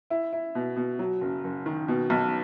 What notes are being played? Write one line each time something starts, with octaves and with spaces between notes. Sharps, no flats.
E4
E4
B2
B2
F#3
F#1
F#1
D#3
B2
B1